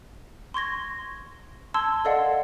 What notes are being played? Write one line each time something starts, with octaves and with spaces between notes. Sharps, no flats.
C6 C#6 G#6 A#6
A5 C6 E6 G#6
A4 A#4 D5 D#5 F5 F#5